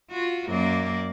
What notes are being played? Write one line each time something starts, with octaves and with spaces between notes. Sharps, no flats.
F4 F#4
F#2 A#3 D5